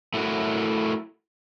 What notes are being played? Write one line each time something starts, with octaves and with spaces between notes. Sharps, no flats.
A3 E4 F#4 A#4